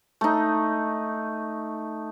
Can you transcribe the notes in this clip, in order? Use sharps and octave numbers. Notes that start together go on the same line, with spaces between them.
A3 D#4